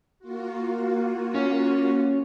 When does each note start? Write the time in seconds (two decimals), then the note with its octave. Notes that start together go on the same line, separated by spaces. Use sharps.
0.19 A#3 F4 F#4
1.34 C#4 C#5